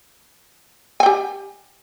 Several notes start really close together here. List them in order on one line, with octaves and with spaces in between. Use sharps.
G#5 G5 G4